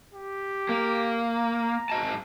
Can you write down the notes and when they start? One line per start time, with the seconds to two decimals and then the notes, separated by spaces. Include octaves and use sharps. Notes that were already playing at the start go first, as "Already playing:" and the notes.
0.14 G4
0.69 A#3
1.31 A#5
1.90 G#2 D#5 A5